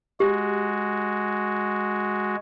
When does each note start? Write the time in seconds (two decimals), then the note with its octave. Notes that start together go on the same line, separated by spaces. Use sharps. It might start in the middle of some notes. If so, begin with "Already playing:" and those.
0.20 G#3 F#4 G4